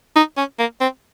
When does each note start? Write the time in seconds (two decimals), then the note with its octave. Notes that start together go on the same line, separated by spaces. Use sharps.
0.16 D#4
0.37 C#4
0.59 A#3
0.81 C4